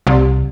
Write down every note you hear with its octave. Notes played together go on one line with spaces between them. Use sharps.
C2